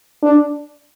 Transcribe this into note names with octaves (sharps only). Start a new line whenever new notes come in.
D4